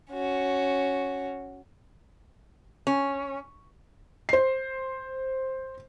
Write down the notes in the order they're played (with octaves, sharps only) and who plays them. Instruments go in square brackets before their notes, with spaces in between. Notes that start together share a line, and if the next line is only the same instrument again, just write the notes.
[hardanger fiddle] C#4 F#4
[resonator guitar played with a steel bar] C#4
[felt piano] C5 C7